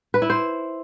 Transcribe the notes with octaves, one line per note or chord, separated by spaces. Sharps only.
B4
E4
C5